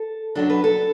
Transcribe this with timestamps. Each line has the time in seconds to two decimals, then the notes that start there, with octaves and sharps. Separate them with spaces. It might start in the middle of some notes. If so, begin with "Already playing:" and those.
Already playing: A4
0.35 F#2 F#3 D4 A4
0.50 B4
0.64 A4